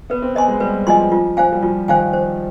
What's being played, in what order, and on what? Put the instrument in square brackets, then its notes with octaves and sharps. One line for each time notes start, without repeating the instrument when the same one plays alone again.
[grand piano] B3 [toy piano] B4
[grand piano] C4
[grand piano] B3 [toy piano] D#5 G#5 C6
[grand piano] G#3
[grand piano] G3 [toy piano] B4
[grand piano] F3 [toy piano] D#5 G#5 C6
[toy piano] F4
C5 F5 G#5
[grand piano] G3
[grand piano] F3 [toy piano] F4
[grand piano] D#3 [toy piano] C5 F5 G#5
[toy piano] C5